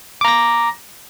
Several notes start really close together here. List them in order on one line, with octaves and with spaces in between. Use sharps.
D6 A#5 A#6